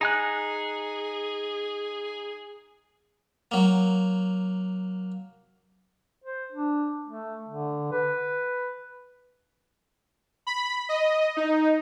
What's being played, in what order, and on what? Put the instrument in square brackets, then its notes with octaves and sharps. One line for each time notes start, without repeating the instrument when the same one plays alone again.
[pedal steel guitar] D#4 G#5 F#6 [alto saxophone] G#4
[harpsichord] F#3 A#3
[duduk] C5
D4
A3
D3
B4
[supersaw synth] B5
D#5
D#4